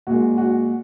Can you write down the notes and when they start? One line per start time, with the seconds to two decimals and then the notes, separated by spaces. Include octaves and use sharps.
0.07 A#2 G#3 F#4
0.38 F#4